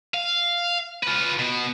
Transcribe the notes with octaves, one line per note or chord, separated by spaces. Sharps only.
F5
F4 B4
B2 B3